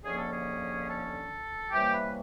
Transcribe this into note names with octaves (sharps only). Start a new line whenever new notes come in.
D#2 D3 F3 A#3 C#4 G#4
A4
G#4
A4
C3 E3 G3 A#3 C#4 G4
B4